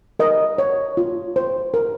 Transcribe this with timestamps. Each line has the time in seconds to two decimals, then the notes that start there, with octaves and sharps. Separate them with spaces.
0.19 A#4 D#5
0.58 C#5
0.97 F4
1.36 C5
1.74 A#4